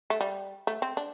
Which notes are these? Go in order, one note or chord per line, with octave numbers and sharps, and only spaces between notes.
A3
G3
A3
C4
D4